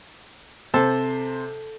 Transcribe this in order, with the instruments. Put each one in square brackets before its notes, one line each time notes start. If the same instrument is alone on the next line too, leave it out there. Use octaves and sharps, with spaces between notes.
[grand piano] C3 C5 [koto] A4